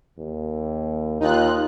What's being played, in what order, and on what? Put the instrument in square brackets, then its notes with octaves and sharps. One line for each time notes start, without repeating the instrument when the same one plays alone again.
[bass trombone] D#2
[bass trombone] D#2 [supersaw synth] D#4 F4 F#6